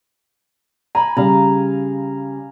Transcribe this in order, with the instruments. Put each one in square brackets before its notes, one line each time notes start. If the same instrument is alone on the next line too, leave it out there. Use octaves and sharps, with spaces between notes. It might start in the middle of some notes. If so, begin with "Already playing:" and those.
[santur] G#5 B5 [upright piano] A#5
[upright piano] C#3 G3 [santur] F5 A#5